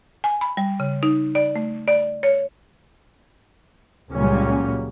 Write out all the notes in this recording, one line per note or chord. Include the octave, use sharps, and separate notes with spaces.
G#5
B5
G3
C#3
D#4
D5
A3
D5
C#5
C#2 A#2 F#3 G3 A#3 C#4